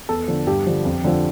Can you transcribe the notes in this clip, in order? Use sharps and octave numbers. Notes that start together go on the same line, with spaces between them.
E2 A4
D3 F3
G2 G4
D3 F3
F2
D3 F3